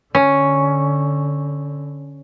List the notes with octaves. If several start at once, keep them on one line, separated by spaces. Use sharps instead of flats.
D3 C#4